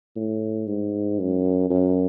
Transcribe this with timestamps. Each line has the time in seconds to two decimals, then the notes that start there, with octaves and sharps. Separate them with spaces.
0.16 A2
0.67 G#2
1.19 F#2
1.70 F#2